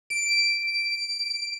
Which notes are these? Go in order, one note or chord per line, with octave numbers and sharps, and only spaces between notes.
D7